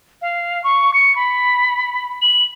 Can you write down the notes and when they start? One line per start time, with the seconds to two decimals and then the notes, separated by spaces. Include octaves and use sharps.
0.21 F5
0.64 C#6
0.93 C#7
1.15 B5
2.21 F#7